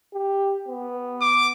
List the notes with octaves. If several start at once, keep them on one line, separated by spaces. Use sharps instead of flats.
G4
B3
D6